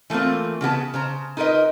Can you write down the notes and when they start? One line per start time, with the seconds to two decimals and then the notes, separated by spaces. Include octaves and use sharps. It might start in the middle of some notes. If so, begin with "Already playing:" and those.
0.10 E3 A3 A#3 C4 F4
0.61 C#3 B3 G4 A5
0.94 C#3 C5 A#5
1.37 D#4 F4 A#4 B4 D#5